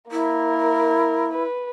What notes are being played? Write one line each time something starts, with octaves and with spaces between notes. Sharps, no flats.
A#3 E4 A#4
B4